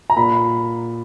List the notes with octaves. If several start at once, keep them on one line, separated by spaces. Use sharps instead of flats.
A#5
A#2 B5